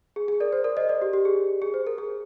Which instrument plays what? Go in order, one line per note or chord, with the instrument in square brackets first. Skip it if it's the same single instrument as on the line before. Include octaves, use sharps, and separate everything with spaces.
[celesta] G#4
G#4
A#4 D5
C5
A#4 D5
C5 D#5
A#4 D5
G4
G4
G#4
G#4
C5
A#4
G#4